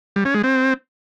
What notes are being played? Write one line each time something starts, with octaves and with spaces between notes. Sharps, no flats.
G3
C#4
G#3
C4